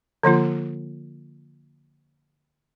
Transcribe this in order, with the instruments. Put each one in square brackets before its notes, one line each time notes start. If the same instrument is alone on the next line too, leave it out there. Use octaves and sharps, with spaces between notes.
[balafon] D3 F3 A#3 F4